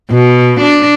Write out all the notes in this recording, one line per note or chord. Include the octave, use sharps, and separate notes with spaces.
B2
D4